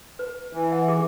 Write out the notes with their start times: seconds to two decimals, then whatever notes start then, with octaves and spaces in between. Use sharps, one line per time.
0.19 B4
0.53 E3
0.72 E5 F#5
0.88 G4 G#4 D6